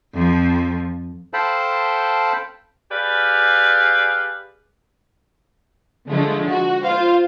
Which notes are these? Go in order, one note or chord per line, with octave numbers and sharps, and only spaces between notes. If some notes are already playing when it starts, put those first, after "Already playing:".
F2 F3
A4 C5 F5 G5 A5 B5
G4 G#4 B4 D5 F5
D3 F3 G#3 A3
F#4
F4 C5 F5